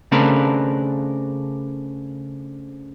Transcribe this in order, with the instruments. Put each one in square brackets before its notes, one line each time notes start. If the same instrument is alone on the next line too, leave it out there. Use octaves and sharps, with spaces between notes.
[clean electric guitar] C#3 A3 C4 D4 A#4 B4